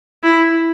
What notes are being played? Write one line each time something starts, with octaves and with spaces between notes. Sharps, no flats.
E4